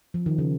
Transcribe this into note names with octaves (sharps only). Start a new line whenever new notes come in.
F3
D#3
C#3